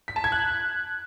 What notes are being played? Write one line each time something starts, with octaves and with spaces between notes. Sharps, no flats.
B6
A5
G#6
F#6